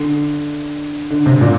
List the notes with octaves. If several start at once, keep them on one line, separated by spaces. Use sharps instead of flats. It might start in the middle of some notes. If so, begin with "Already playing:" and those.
Already playing: D3
D3
C3
A#2